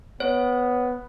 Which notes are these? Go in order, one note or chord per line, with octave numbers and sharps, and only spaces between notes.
B3 C#5